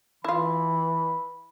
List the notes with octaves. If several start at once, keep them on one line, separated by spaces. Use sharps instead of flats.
E3 E4 F4 B5